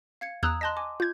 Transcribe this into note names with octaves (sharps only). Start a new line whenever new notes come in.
F5 G#6 C#7
E2 A#5 D#6 E6 F#6 G#6
D#5 A5 C6 F#6 A#6
G#5 D6
F4 G6 G#6